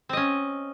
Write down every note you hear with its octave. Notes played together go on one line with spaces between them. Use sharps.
C4 C#4 D#5